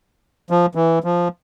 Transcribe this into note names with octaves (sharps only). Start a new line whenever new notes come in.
F3
E3
F3